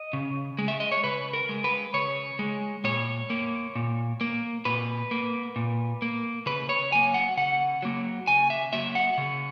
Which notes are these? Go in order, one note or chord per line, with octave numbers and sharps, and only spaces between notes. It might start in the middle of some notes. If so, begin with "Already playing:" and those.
Already playing: D#5
C#3
G#3
E5
D#5
C#5
C#3 B4
A#4
G#3
B4
C#3 C#5
G#3
A#2 C#5
A#3
A#2
A#3
A#2 B4
A#3
A#2
A#3
C#3 B4
C#5
F#3 A#3 G#5
F#5
C#3 F#5
F#3 A#3
C#3 G#5
E5
F#3 A#3 E5
F#5
C#3